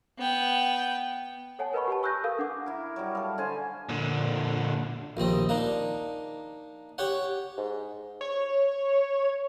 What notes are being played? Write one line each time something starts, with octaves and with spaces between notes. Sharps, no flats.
B3 G5
A4 C#5 F#5 G#5 A5
A#4 B4 D#5 G#5 B5 C#6
G4 B4 G#5 A5
C#6 E6 F#6 G6 A#6
A4 A#4 F5 D#6
D4 F#5 D6
E4 A#4
F#3 G3
A4 F5
D3 C5 G#5
A#2 D3
A#1 D#2 C4 D#5
A#3 D4 D#4
G4 C#5 F#5
G#2
C#5